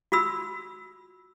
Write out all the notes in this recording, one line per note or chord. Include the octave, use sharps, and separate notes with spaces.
F4 F#4 B5 E6